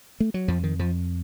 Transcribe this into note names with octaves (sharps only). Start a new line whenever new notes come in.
A3
F#3
F2 F3
D#3
F2 F3